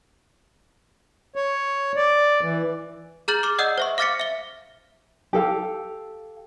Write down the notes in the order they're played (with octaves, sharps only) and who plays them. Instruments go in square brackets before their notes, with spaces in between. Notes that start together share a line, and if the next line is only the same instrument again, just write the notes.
[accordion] C#5
D5
E3
[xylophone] G#4 A#5 F6 G6 A6 F#7
D6 F6
D5 D#5 F#5 D#6 E6 G6
C5 E5 C#6
F5 D6 F6 A6 B6 C#7
E5 G7
[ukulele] G4 A4 F5